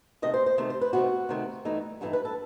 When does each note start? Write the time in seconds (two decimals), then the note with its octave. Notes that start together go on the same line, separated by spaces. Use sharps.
0.22 C3 D#3 A3 D#5
0.34 C5
0.46 C5
0.58 C3 D#3 A3
0.70 C5
0.81 B4
0.93 C3 D#3 A3 F#4
1.29 C3 D#3 A3
1.65 G2 E3 A3 D#4
2.01 G2 E3 A3 D#4 F#4
2.13 B4
2.25 A4